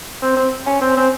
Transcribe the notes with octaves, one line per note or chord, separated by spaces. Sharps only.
C4
C4
C#4
C4
C4